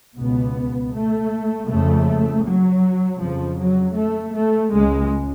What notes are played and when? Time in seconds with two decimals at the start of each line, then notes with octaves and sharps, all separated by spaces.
0.18 C#2 B2 B3
0.93 A3
1.68 F2 C#3 A3
2.45 F#3
3.20 F2 C#3 F3
3.58 F#3
3.96 A3
4.34 A3
4.72 C#2 C#3 G#3